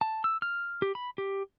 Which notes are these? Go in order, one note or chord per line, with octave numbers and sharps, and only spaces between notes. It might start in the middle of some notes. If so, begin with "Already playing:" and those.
A5
E6
F6
G4
B5
G4